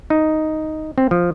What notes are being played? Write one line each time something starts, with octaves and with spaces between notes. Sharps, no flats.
D#4
C4
F3